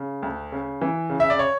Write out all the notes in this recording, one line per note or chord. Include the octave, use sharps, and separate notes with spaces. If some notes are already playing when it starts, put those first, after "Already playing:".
Already playing: C#3
D2
C#3
E3
C#3
E5
D5
C#5